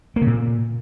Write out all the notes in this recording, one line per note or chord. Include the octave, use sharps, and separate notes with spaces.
A#3
C#3
A#2